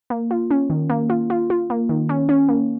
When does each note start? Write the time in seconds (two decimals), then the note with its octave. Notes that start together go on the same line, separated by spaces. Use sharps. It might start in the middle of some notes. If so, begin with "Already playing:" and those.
0.10 A#3
0.31 F4
0.51 C#4
0.70 D#3
0.90 A#3
1.10 F4
1.30 F4
1.50 F4
1.70 A#3
1.89 D#3
2.09 C#4
2.29 C#4
2.48 A#3